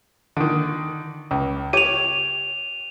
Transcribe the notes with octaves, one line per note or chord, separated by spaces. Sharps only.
D3 D#3
C#2
G4 C#5 D6 D#7 F7